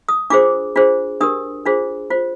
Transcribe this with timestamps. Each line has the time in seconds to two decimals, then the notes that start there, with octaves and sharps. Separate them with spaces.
0.09 D#6
0.30 D4 F4 G#4 C5 D6
0.76 D4 F4 G#4 C5
1.20 D4 G4 A#4 D#6
1.65 D4 F4 G#4 C5
2.10 F4 C5